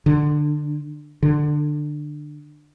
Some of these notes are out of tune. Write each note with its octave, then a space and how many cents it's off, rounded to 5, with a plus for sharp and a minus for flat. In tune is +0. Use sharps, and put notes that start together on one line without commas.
D3 +20
D3 +20